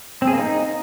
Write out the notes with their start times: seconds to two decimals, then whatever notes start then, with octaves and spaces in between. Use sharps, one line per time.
0.22 C4
0.27 G#4
0.33 A#3
0.38 D#4